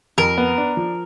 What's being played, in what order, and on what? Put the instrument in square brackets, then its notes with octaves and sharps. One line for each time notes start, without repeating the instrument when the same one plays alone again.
[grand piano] F2 [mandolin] A#4
[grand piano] B3
D4
F3